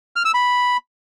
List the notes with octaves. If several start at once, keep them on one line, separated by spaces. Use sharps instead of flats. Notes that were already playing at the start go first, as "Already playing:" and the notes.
F6
E6
B5